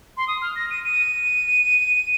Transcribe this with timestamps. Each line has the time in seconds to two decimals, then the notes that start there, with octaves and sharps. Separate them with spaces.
0.17 C6
0.28 D#6
0.42 F6
0.56 A#6
0.70 D#7
0.84 D#7